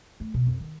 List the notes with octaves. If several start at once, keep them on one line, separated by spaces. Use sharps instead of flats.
A3
B2
F2
D#3